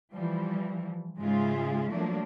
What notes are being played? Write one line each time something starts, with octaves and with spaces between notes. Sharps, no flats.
E3 F3 G3
G#2 C#3 G#3 F4 G#4 E5
F3 F#3 A3 A#3 D4